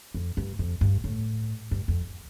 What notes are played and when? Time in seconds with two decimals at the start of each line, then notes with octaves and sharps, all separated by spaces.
0.14 F2
0.37 G2
0.59 F2
0.81 G2
1.04 A2
1.71 G2
1.88 F2